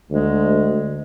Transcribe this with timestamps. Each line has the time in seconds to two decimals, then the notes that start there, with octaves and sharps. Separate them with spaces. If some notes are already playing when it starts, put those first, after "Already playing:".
0.11 D2 G#3